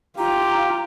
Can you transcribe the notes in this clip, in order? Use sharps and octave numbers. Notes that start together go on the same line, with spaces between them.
F4 G4 A#5